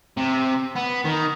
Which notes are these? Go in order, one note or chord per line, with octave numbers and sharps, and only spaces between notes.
C3
B3
D#3